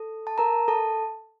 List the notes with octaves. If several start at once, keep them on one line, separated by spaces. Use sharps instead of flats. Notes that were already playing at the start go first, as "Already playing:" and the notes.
Already playing: A4
A5
A#4 A#5
A4 A5